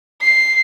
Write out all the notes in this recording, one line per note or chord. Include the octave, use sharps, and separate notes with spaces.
C7